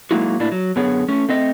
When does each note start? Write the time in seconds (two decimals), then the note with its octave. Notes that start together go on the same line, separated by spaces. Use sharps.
0.11 F#3 G#3 A#3 D#4 E4 F#4
0.39 A2 A#3 D4 E4 D5
0.52 F#3
0.76 F#2 D3 B3 G#4 C#5
1.08 A3 C#4
1.29 A3 C4 D#5